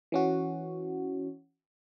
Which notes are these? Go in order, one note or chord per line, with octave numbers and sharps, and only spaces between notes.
E3 C#4 F#4